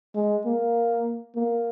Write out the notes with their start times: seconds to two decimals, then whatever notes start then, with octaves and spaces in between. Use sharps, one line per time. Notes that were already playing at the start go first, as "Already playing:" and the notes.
0.15 G#3
0.46 A#3
1.35 A#3